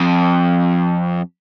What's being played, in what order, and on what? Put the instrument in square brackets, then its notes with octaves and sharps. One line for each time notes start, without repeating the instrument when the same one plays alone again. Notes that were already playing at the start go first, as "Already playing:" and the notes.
Already playing: [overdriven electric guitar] F2